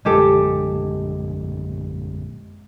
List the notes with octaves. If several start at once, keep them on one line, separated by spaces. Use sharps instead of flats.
A#1 F#2 D3 G#3 G4 A4